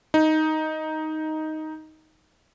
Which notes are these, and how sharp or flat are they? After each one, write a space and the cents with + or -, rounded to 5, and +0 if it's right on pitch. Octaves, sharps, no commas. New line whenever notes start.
D#4 +5